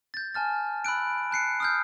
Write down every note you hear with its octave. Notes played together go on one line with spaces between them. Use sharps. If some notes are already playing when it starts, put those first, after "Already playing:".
G6 A6
G#5 A5 F6 A6
B5 E6 F#6 D7
A5 F#6 C7 C#7
D#6 F6 G6